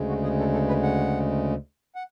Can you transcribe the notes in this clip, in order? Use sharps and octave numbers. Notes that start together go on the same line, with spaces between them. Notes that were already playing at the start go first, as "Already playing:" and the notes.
Already playing: D2 C#3 G#3
F#4
G#4
A4
A4
B4
F#5
F#5